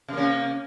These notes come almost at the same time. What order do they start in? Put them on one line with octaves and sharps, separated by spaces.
C3 A#3 C#4